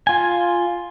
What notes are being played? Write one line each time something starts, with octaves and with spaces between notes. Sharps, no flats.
F4 G#5